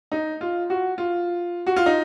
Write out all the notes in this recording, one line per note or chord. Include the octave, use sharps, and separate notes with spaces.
D#4
F4
F#4
F4
F#4
F4
D#4